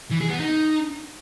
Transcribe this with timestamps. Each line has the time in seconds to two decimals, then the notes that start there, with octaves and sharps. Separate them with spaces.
0.11 E3
0.21 G#4
0.30 B3
0.40 D#4